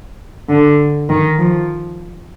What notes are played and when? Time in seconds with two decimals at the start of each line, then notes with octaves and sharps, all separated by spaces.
0.49 D3
1.09 D#3
1.38 F3